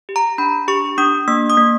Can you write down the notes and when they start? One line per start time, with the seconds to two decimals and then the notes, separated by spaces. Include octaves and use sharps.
0.09 G4
0.16 A#5
0.38 D4 B5
0.68 G4 C#6
0.98 D4 D#6
1.28 A#3 E6
1.50 D#6
1.57 A#3